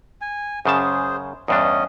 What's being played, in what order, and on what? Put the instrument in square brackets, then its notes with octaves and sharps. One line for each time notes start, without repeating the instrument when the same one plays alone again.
[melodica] G#5
[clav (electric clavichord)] F#2 C#3 A5 [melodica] G#4 C5
[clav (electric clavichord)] E2 G2 D4 [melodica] C#4 D#5